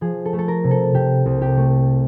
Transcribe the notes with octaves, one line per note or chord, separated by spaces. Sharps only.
F3 G#4
A4
A3
A4
A#4
C3
A4
C3 G4
C2
G4
A3